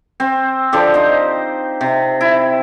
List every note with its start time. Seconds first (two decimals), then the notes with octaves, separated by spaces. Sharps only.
0.20 C4
0.73 D3 F3 G4
0.94 D#4 C5
1.81 C3
2.21 E4